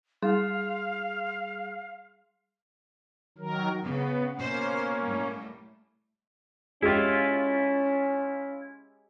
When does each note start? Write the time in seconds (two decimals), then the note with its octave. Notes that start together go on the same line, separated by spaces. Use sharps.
0.22 G3 G#4 F5 C6
3.38 D#3 F#3 A#4
3.83 C#3 B3
4.38 B2 A#3 C#4 C5
5.01 A2 G3
6.82 G#3 C#4 E4 F4 G4